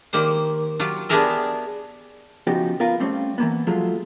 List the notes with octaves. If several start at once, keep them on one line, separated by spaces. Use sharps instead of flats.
D#3 A#3 G4 C5
F#3 F4 G4
B3 D4 G4 G#4 A#4 E5
C#3 F3 B3 D#4 F#4 G4
B3 F4 A#4 B4 F5
G3 A3 C4 C#4
E3 A#3 B3
F3 F#3 G#3 A3 F4